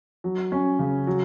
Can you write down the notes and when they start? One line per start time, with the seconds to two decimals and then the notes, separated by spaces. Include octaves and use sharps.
0.24 F#3
0.52 C#4
0.79 C#3
1.07 F#3